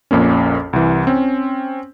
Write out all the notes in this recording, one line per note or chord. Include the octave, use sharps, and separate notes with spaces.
A#1 F2 A#3 C#4
C2 E3
C4 C#4